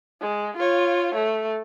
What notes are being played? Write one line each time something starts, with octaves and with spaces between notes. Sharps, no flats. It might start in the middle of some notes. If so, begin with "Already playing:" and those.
G#3
F4 C#5
A3